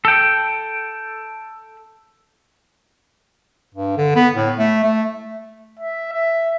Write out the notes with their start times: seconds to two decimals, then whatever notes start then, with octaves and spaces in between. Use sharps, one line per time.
0.05 A4 G5
3.74 G2
3.97 D3
4.15 B3
4.35 A2
4.58 A3
4.83 A3
5.79 E5
6.12 E5